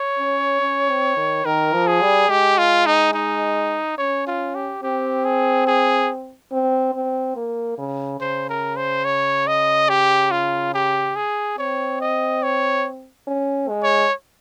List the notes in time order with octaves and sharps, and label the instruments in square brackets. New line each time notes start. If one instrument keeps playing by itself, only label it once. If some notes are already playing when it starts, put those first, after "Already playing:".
Already playing: [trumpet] C#5
[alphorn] C#4
C#4
C4
D#3
[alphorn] D#3 [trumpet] A#4
[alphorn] F3
[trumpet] G#4
[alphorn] G3
[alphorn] G#3 [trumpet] G4
[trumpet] F4
D#4
D#4
[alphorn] C#4 [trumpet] C#5
[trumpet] F4
G4
[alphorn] C4 [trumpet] G4
[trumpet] G#4
G#4
[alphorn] C4
C4
A#3
C#3
[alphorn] C#3 [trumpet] C5
[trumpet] A#4
C5
C#5
D#5
G4
F4
G4
G#4
[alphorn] C4 [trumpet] C#5
[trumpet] D#5
C#5
[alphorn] C#4
G#3
[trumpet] C#5